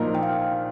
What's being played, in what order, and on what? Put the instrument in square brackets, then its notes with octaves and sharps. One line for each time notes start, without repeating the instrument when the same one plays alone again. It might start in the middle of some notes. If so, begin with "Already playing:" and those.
Already playing: [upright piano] A#1 A#2 F3 D#4 A#4
[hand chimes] G5
F5